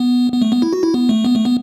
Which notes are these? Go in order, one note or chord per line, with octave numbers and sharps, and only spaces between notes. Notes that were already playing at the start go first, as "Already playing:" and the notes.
Already playing: B3
B3
A3
B3
E4
F#4
E4
B3
A3
B3
A3
B3